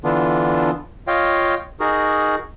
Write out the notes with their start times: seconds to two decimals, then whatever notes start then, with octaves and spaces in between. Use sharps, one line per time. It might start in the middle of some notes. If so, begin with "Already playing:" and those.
0.04 D3 E3 B3 D4 F4
1.08 F4 C#5 D#5 F5 G5
1.80 D#4 F#4 G#4 A#4